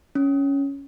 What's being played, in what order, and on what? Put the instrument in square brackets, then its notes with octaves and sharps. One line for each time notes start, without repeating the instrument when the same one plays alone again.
[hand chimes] C#4